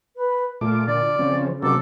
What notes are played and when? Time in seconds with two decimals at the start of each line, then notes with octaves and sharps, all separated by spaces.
0.16 B4
0.61 A#2 A3 F4 D6
0.88 D3 D5
1.19 C#3 F3 C4 C#4
1.62 C3 F#3 A#3 A4 D6